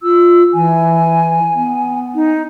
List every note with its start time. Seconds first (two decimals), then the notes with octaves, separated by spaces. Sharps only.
0.03 F4 E6
0.54 E3 G#5
1.55 B3
2.15 D#4